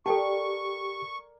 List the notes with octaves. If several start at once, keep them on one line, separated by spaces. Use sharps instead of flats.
G4 A4 A#4 D5 G5 A5 C#6